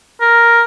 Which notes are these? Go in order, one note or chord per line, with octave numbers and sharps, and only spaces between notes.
A#4